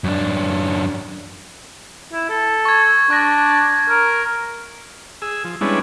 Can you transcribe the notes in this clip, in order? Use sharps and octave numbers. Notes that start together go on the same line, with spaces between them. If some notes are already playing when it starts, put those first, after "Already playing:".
F#2 D4
E4
A4
C#6 G#6
D4 C#6 A#6
A#4
G#4 E6
F3
G3 G#3 B3 C#4 D4 E4